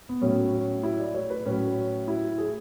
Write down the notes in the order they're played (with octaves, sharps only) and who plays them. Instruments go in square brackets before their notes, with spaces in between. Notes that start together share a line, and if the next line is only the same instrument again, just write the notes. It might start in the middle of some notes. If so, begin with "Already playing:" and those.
[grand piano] B3
A2 F#3 C#4
C#4
E4
D5
C#5
B4
A2 F#3 C#4
E4
G#4